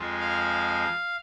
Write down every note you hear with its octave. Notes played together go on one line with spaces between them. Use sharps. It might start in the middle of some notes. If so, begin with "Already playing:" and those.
Already playing: F2 F3 G#3
F5